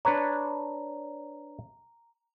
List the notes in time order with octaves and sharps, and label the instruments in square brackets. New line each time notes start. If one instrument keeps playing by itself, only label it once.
[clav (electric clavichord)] D4 B4 C#5 [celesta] A#5